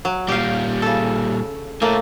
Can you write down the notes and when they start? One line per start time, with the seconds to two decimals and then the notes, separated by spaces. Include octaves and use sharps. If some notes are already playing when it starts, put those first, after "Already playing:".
0.05 F#3
0.28 A#2 G3 G4 F5
0.82 C#3 A4
1.82 A2 A3 A#3